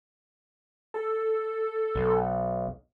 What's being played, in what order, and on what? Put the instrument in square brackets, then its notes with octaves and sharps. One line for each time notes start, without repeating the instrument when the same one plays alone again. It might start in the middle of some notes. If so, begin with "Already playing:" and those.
[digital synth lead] A4
[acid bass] B1